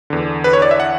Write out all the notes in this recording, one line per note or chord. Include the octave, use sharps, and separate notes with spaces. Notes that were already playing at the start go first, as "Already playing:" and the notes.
E2 D3
B4
C#5
D5
E5
F#5